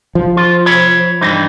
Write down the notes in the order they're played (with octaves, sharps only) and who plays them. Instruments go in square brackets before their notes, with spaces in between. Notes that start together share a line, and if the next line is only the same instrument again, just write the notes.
[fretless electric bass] F3
[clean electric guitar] F4
C#5 B5
G2 E3 D#4